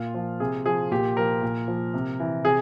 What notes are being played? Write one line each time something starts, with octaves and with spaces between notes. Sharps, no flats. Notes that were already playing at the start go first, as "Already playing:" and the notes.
Already playing: A#2 F4
F3
C3 G#4
F3 G#4
A#2 G4
F3 A#4
A#2
F3
C3
E3
C3 G#4